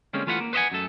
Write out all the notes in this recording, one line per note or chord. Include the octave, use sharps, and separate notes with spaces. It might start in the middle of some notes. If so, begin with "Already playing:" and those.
D3 G3 G#3 A#3 C4 C#4
E3 A3 F4 B4 F5 F#5
A#3
B4 C5 D#5 E5 F#5 G#5
F#2 A3 A4